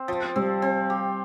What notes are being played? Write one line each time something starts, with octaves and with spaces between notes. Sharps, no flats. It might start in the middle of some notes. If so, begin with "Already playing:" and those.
Already playing: C4
F3
G3 C4
C4
G4